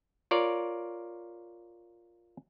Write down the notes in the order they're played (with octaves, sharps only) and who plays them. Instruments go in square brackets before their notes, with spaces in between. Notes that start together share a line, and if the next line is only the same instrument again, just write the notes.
[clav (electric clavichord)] F4 A#4 C#5 D5